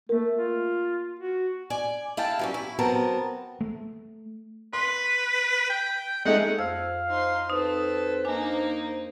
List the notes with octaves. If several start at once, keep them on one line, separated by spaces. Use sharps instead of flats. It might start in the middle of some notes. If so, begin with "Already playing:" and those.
A3 A#3 A#4
F4
F#4
D5 G#5
E4 F5 G5 A5
F#3 G3 C#4
E4
F#3 B3 C4 A#4 A5
A3
B4 C6
G5
G#3 A3 D#4 F#5
F2 C5 F5 E6
D#4 C6
C4 D#4 A4 B4
A#3 D4 D#4 G#5